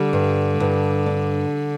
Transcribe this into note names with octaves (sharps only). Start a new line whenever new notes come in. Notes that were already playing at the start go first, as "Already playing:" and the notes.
Already playing: D3 G3
G2
G2
D4